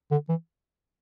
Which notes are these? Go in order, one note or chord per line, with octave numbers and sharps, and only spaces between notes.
D3
E3